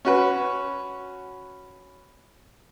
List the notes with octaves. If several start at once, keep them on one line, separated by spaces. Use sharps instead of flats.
C#4 F#4 B4